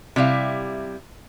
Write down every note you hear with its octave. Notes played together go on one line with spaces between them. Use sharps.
C3 G3 E4 F5